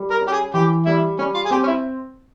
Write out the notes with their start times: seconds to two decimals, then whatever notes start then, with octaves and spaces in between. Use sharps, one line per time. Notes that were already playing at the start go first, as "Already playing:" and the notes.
Already playing: G3
0.11 A#4
0.21 C#4
0.28 G4
0.32 G#4
0.54 E3 G4
0.86 G3 E4
1.19 G3 C#4
1.35 F4
1.45 G#4
1.51 C4 G4
1.64 C#4
1.67 E4